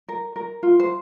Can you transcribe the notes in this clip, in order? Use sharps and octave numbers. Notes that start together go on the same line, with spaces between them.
A#4
A#4
F4
C5